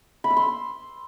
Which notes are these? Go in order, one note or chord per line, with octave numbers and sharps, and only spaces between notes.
B5
E6
C6